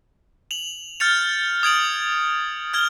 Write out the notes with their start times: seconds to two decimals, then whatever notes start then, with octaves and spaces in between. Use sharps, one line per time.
0.51 F7 F#7
1.00 F6 G6 A6 C#7 F7
1.63 D#6 G#6 D7 F#7
2.74 F6 G#6 G7